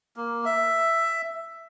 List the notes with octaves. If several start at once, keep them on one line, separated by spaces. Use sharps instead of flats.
A#3
E5